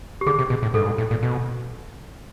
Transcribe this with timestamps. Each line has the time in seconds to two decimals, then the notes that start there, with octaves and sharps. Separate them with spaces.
0.21 G4
0.26 D3 G#4
0.39 C3
0.50 B2
0.63 A2
0.74 G#2 A4
0.80 G2
0.86 G#2
0.98 A2
1.11 A#2
1.23 B2